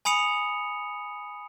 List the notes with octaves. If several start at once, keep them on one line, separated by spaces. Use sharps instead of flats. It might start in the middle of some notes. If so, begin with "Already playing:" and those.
G#5 B5 D#6 C#7 F7